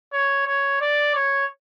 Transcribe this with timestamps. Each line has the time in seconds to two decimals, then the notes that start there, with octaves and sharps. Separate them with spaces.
0.13 C#5
0.47 C#5
0.81 D5
1.15 C#5